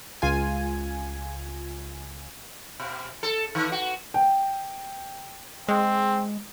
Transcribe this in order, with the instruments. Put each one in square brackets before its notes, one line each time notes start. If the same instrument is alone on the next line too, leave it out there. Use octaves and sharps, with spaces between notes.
[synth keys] C#2 F4 G#5
[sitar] B2
A4
D#3
F#4
[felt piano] G5
[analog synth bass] G#3 [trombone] C4